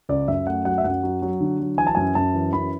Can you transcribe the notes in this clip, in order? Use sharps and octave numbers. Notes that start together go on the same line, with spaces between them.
C#2 D5
F#2 E5
A3 F#5
F#3 F#5
E5
F#2 F#5
F#3
F#3
D3
F#3
E3 G#5
A5
F#2 G#5
F#2 A5
E3
F#2 B5